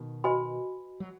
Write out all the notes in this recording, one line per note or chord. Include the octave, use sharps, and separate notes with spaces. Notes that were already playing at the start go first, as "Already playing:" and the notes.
Already playing: B2 D#3
F#4 B4 D#5 G#5 B5
F#3